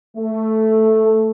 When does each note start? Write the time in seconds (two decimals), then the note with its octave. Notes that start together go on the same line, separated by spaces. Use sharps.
0.17 A3